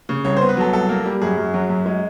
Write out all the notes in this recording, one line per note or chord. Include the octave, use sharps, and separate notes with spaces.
C#3
C2 C#5
C5
B3
B4
F#3 A4
C2 A4
A#3
G3
F#2 G#4
F#2
F#3
F#2
G#3